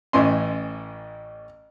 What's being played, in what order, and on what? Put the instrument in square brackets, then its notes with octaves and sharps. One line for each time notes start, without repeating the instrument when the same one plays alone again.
[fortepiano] A1 A2 E3 C#4 D#5 C6